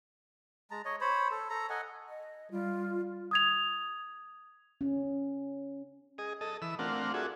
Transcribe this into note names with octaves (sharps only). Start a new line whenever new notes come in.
G#3 A5 A#5
C#5 D#5
C5 C#5 B5
A4
A4 A#5
A4 D#5 F#5 G#5
D#5
G3 F4
D#6 G#6 F7
C#4
G#4 D#5
A4 D#5
E3 B5 E6
A3 C4 D4 F4 A#4 F#5
D4 F#4 G#4 A4 E5